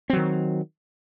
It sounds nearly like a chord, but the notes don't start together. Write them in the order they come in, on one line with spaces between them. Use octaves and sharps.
C4 F#3 D#3